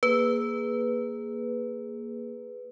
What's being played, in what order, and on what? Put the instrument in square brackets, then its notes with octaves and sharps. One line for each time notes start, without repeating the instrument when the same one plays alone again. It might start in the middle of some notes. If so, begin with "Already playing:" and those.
[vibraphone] A#3 G#4 [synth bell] B4